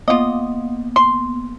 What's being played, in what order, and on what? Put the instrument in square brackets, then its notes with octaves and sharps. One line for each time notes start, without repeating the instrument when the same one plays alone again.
[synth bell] A#3 B3 [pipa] F4 D#5
[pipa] C6